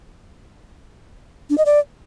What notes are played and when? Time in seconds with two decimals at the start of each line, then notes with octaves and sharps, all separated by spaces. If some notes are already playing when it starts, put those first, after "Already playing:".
1.50 D4
1.58 D#5
1.66 D5